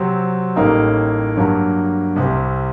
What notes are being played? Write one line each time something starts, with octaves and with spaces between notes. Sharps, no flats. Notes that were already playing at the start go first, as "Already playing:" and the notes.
Already playing: C3 F#3 C4
A1 A2 G3 A#3 D#4
G2 F#3 A#3
C2 C3 G3 C4